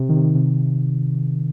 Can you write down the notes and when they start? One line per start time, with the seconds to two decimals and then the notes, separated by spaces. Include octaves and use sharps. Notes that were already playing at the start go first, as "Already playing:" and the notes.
Already playing: C3
0.09 D#3
0.16 C3
0.24 D#3
0.35 C3